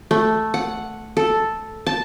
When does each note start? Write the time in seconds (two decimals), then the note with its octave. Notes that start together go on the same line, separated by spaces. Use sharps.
0.11 A3
0.54 F#5
1.17 A4
1.87 A5